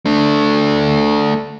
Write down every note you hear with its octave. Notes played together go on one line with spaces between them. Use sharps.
A3 D4